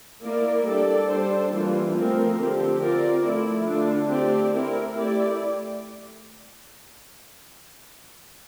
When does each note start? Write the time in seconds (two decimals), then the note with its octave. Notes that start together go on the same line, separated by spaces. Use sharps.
0.23 A#3 E4 A#4 D5
0.66 G3 D4 A4 D5
1.10 G3 D4 A4 C5
1.53 E3 G3 A#3 D4 F4
1.96 F3 A3 C4 F4 A#4
2.38 D3 F3 C4 G4
2.81 C4 F4 A#4 D5
3.24 F3 A3 E4
3.67 D3 A3 D4 F4
4.10 A3 C4 G4 D5
4.53 C4 E4 A#4
4.96 A3 E4 G4 D5